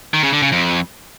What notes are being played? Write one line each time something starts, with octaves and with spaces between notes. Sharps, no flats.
D#3
C#3
D3
C#3
F2